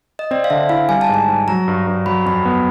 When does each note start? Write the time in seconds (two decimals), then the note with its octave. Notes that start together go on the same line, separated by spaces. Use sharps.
0.19 D#5
0.31 C4 D5
0.44 F5
0.50 D3 E5
0.69 E4 F5
0.89 G3 G#5
1.01 A5
1.09 G#2 G#5
1.28 G#2
1.48 F#3 A#5
1.68 G2
1.87 G2
2.06 F#3 B5
2.26 F2 B5
2.45 B3